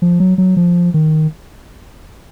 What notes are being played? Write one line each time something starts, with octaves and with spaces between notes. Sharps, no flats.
F3
F#3
F#3
F3
D#3